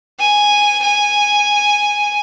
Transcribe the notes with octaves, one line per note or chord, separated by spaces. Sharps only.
G#5
G#5